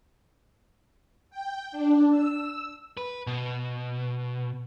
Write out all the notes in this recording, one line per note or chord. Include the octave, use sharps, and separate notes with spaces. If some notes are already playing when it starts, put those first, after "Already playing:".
G5
D4
E6
B4
B2